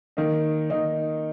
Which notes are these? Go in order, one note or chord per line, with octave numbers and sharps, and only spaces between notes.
D#3 A#3 D#4
D#3 A#3 D#4